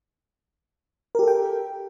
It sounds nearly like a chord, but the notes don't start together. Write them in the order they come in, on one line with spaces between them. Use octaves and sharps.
A#4 G4 A4 G5